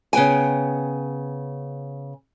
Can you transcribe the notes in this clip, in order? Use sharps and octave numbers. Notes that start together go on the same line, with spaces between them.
C#3 B3 G5 G#5